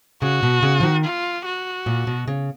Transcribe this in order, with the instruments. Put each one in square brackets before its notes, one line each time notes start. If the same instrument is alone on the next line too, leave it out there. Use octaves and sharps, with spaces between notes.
[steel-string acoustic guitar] C#3 [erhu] F#4
[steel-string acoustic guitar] B2
C#3
F3
D#3
[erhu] F4
F#4
[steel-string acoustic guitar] A#2
B2
C#3